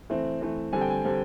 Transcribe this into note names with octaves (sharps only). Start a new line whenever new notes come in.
E3 A3 C4
E3 A3 C4
D3 G3 C4 G#5
G5
G#5
D3 G3 C4